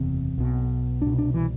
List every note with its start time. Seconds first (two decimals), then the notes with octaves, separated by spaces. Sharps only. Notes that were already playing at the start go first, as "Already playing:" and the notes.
Already playing: F#1 E2 C3 C4
0.38 B1 B2
1.02 C2 B2 D4
1.18 D4
1.34 E3